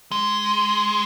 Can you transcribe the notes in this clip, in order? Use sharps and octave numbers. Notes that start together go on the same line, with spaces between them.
G#3